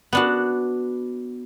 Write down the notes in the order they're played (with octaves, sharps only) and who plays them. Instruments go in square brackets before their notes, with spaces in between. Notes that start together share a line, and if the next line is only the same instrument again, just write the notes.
[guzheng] B3 D4 F#4